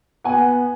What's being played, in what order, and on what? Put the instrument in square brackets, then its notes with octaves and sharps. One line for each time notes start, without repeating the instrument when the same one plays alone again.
[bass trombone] B3 [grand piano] F#5 G#5